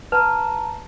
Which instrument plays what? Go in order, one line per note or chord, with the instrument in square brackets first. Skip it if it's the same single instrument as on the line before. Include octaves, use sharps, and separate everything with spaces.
[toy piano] B4 [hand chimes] A5 A#5